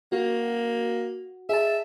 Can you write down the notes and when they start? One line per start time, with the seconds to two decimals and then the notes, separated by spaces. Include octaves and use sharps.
0.12 A#3 F#4
1.49 G#4 E5 A5